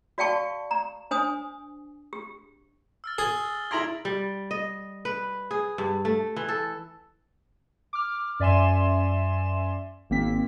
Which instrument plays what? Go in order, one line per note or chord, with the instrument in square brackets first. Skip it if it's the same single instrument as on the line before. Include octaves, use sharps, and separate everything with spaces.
[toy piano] F#4 D5 F5 G5 A5 C#6
A#5
D4 C5 G#5 D#6
G4
[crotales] E6 F6 A6
[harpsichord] G#4 [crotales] A6 F#7 G7
[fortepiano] E4 A#5 C6 [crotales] G#6 D7 F#7
[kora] G3
D#5
B4
G#4
G2
A3
E3
A4
[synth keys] D6 F6
F#2 D5 E5 G#5 C6 E7
G#1 A#3 C4 B6